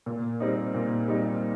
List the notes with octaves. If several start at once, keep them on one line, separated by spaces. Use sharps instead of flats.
A#2
G3 C4 D#4
A#2
G3 C4 D#4